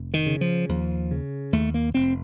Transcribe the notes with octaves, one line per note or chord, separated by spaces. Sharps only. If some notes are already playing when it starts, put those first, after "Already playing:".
Already playing: F1
D#3
C#3
F3
D#2 F3
C#3
D#2 A3
A#3
F1 C4